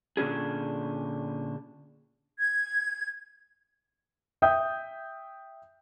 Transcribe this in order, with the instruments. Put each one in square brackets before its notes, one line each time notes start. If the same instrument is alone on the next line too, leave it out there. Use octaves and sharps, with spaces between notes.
[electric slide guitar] A#2 D3 C#4 D4 G#4
[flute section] G#6
[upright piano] E5 G5 D#6 G6